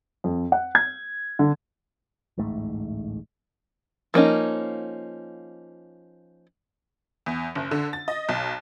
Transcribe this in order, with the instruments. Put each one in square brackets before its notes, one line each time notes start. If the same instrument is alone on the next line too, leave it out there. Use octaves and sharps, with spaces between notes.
[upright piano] F2
F#5
G#6
D3
[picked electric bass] D1 A1 G#2 A3
[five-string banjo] F3 A#3 C#4 D#4
[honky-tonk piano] E2
F#1
D3
A6
D#5
B1